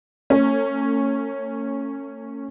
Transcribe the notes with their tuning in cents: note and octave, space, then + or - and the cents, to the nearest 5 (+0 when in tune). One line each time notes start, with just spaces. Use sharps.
A3 +40 C#4 -10